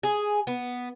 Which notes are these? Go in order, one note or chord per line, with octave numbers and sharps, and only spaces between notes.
G#4
B3